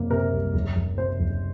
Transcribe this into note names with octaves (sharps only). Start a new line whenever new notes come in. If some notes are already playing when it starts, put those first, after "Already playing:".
Already playing: F#1 C3 A#3
C3 A#4
C2
F#1
F#1
C3 C5
F#1